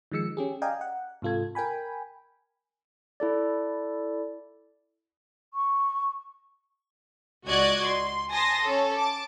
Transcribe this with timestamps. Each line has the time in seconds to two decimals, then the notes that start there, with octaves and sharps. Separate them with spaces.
0.12 D#3 F3 G#3 E6 C#7
0.37 C#4 G4 G#4
0.62 D5 D#5 F5 G5 G#5 A#5
0.81 F#5
1.22 G#2 C3 F4 A4 G#6
1.55 A#4 G5 G#5 B5
3.20 E4 A4 D5
5.54 C#6
7.46 C#2 F#4 D5 D#5 F#6 G#6
7.84 C6
8.32 G#5 A5 C6 D#6 A#6
8.63 C#4 A4
8.95 A5 D6